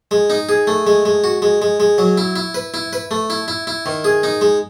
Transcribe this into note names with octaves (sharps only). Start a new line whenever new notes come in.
G#3
D#4
G#4
A3
G#3
G#3
F#4
G#3
G#3
G#3
F#3
E4
E4
B4
E4
B4
A3
E4
E4
E4
D#3
G#4
D#4
G#3